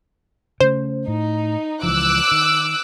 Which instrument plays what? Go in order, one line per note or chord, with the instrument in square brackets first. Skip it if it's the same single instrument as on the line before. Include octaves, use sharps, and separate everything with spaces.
[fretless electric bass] C#3 A3 [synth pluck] C5
[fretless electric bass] A2 [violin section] D#4
[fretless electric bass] C#2 E3 F3 [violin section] D6 E6 F#6
[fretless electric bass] D#3